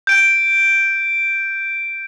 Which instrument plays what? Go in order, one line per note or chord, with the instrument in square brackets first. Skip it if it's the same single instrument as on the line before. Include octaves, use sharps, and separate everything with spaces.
[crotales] G6 D7